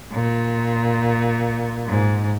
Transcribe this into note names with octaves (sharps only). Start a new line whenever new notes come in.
A#2
G#2